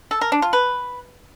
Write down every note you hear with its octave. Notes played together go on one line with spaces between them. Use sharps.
A4
A#4
D4
F4
B4